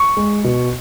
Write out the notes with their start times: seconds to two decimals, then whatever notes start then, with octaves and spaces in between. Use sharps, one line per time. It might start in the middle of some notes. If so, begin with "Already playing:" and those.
Already playing: C#6
0.17 G#3
0.44 B2